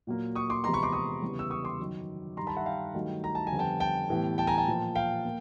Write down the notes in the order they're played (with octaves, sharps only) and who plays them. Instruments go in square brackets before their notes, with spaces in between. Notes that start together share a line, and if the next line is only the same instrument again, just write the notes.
[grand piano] A#2 F#3 A#3
C#6 D#6
C6 D6
E2 C3 F3 G#3 B3 A#5 C6
B5 C#6
C6 D6
C#6 D#6
E2 C#3 E3 G3 B3
E6
C#6 D#6
C6 D6
F#2 D#3 F#3
G2 D#3 G3 A#5 C6
A5 B5
E5 F#5
F5 G5
G2 D#3 F#3 A3
A#5
A5
G#5
F2 D3 G3 B3
G5 A5
G5 A5
A2 E3 G3 B3
G5 A5
G#5 A#5
G5 A5
A#2 F3 A#3
F5 G5
A#3